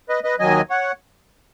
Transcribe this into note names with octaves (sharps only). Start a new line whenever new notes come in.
B4 D#5
B4 D#5
D#2 D#3 F#3 D#5 G#5
C#5 F#5